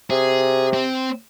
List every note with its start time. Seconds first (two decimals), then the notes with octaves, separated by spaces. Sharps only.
0.10 C3 G#4
0.73 C4